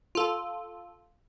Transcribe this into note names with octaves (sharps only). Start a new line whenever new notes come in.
F4 A4